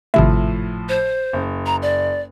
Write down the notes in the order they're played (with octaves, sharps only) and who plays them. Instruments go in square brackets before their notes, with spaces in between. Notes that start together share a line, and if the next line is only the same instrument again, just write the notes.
[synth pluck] G#1 C3 E5 [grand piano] A2 F3
[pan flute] C5
[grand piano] F#1
[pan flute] A#5
D5